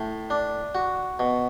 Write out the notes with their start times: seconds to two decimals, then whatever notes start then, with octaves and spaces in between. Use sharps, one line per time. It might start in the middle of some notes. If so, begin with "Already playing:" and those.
Already playing: A2
0.30 D4
0.75 F#4
1.19 B2